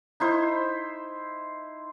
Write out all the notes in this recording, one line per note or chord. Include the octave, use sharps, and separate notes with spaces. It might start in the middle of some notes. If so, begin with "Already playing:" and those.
D#4 E4 C5